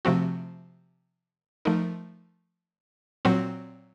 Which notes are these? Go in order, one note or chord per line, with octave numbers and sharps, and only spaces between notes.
C3 F3 A3 C4 F#4
F3 A3 D#4 A#4
A#2 F#3 C4 F#4